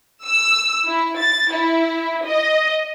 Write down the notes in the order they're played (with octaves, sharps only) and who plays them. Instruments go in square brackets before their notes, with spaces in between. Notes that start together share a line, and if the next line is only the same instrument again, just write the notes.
[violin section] E6
E4
A6
E4
D#5